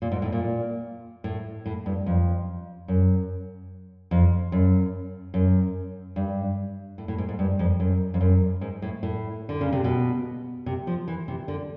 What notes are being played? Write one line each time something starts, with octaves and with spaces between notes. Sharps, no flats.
A#2
G#2
A2
A#2
A2
A2
G2
F2
F#2
F2
F#2
F#2
G2
A2
A2
G#2
G#2
G2
F2
F#2
F2
F#2
G#2
A2
A2
D3
C#3
C3
B2
C3
F3
E3
C3
D3